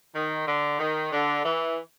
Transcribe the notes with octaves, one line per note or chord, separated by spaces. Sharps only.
D#3
D3
D#3
D3
E3